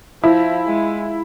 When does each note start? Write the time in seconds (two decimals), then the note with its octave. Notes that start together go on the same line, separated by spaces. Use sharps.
0.24 F3 E4
0.67 G#3